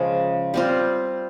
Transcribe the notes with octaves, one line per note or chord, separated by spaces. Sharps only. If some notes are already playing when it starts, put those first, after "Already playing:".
Already playing: C#3 F3 G#3
G3 C4 F4